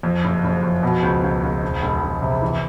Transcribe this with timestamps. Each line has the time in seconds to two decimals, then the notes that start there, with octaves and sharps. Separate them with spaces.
0.03 F2
0.24 F#1
0.44 F#1
0.63 F2
0.83 B2
1.03 C#2
1.23 C#2
1.43 C#2
1.62 E1
1.82 E1
2.02 E1
2.22 C3
2.42 E3